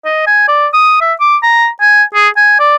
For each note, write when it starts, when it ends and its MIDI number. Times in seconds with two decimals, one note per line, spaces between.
0.05 0.25 75
0.27 0.48 80
0.48 0.67 74
0.73 0.97 87
1.01 1.13 76
1.20 1.36 86
1.43 1.68 82
1.81 2.03 80
2.14 2.29 68
2.37 2.55 80
2.60 2.76 74